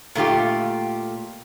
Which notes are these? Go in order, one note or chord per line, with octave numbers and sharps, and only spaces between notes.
A#2 A3 F4 G4